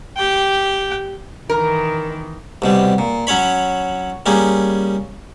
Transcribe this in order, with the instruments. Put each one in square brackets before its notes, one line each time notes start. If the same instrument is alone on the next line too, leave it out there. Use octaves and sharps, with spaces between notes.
[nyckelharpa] G4 G5
[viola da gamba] D#3 E3 [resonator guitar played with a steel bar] A#4
[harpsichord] C2 B2 G3
A#2
F#3 C#4 C#5 B5
G3 A#3 C#4 G#4